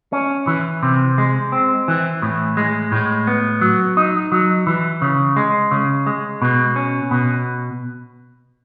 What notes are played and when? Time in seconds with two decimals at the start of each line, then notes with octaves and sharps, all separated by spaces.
0.12 C#4
0.47 E3
0.83 C3
1.18 G#3
1.52 C4
1.88 E3
2.22 A2
2.57 G#3
2.92 A2
3.27 B3
3.61 F#3
3.97 D#4
4.32 F#3
4.67 E3
5.02 C#3
5.36 G#3
5.71 C#3
6.06 G#3
6.42 B2
6.76 C#4
7.11 B2